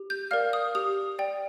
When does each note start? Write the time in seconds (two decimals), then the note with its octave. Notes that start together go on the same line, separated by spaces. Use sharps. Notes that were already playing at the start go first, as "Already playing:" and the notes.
Already playing: G4
0.10 G6
0.31 A#4 D5 F5 F6
0.53 D#6
0.75 G4 D#6
1.19 D5 G5